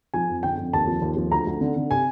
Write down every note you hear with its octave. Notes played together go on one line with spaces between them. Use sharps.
F3 G#5
F2
D3 G5
F2
D#2 A5
F3
D#2
F3
D2 A#5
D2
D3
D3
C3 G#5